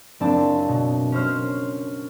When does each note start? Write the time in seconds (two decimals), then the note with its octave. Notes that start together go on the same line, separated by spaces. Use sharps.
0.20 F#1 C4 D4 A5
0.68 B2
1.12 C#4 C5 F6